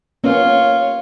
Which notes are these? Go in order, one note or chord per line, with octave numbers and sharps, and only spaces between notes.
A#3 B3 C#4 F4 C#5